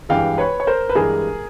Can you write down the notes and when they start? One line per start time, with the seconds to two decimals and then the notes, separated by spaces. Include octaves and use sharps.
0.09 G2 E3 G#3 F5 G5
0.38 B4 C#5
0.60 C#5
0.67 A#4 C5
0.89 B4
0.95 G2 E3 G#3 G#4 A#4